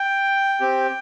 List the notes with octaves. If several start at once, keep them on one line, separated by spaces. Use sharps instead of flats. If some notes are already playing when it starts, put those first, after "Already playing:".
Already playing: G5
C4 G4